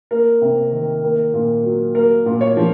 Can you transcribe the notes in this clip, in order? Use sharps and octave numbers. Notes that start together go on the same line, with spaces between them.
A#3 A#4
C3
D#3
A#3
A#2
F#3
A#3 A#4
A#2
C#5
F3